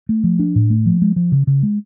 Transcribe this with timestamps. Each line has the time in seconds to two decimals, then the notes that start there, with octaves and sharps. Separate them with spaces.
0.09 A3
0.24 F3
0.39 D4
0.55 A2
0.70 A3
0.86 F3
1.02 G#3
1.16 F3
1.32 C#3
1.47 C#3
1.63 G#3